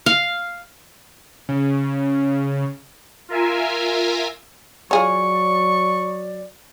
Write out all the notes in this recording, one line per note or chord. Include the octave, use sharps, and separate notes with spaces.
F5
C#3
F4 A#4 E5 G#5
F#3 F4 G#4 C#5 D5 C#6